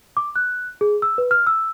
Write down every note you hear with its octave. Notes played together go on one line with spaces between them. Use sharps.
D6
F#6
G#4
E6
B4
F6
E6